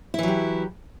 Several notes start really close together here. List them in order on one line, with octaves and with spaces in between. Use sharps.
E4 E3 F#3 G4